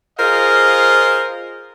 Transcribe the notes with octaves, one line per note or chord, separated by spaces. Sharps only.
F4 G#4 A#4 C5 D#5 F5